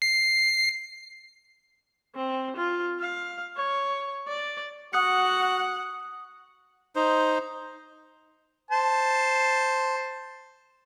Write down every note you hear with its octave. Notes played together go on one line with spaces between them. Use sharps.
C7
C4
F4
F5
C#5
D5
F#4 F#5 D#6 F#6 C#7
D#4 C5
C5 A5